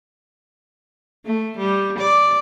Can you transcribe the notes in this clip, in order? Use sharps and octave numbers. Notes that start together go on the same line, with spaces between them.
A3
G3
D5